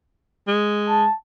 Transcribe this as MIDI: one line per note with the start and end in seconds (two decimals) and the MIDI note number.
0.48 1.06 56
0.89 1.15 81